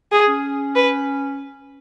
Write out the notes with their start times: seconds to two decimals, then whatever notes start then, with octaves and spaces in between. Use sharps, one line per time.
0.12 G#4
0.28 C#4
0.75 B4